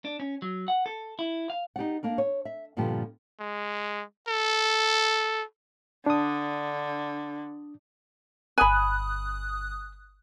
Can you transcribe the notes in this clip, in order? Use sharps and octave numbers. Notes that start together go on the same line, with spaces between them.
D4
C#4
F#3
F#5
A4
E4
F5
D#4 G4 D5 F#5
A#3 D4 A#4
C#5
E5
G2 A#2 D3 F3 B3 G4
G#3
A4
D3 D4 D#6
G1 G#5 B5 D#6 F#6